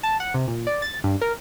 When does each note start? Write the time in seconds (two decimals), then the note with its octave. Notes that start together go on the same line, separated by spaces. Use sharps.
0.03 A5
0.20 F#5
0.34 C3
0.48 A#2
0.67 D5
0.82 A6
1.04 G2
1.21 A#4